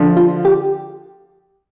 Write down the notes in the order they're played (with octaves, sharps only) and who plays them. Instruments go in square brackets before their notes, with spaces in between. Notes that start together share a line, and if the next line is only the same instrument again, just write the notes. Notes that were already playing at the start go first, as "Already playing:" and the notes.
Already playing: [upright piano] D3 F3
[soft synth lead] F4
G4